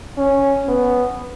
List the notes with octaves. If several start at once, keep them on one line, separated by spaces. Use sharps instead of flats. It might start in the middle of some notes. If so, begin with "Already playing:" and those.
C#4
B3